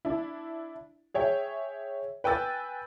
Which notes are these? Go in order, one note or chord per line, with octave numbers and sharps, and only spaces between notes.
D4 E4
G#4 C#5 E5 G5
B4 G5 G#5 E6 A6